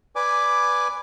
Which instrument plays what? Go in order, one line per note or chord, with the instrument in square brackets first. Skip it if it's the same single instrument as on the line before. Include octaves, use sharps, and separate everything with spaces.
[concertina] B4 D5 G#5 D6